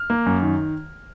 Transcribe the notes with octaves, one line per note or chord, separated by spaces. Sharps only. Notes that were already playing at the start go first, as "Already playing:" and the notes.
Already playing: F6
A#3
F#2
D#3